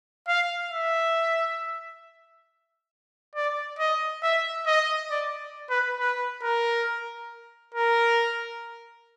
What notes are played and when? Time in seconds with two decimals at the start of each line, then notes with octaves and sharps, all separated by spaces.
0.28 F5
0.72 E5
3.36 D5
3.79 D#5
4.23 E5
4.67 D#5
5.11 D5
5.70 B4
6.00 B4
6.43 A#4
7.74 A#4